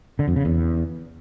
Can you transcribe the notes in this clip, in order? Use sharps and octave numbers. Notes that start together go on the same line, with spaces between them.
D3
F2
C#3
E2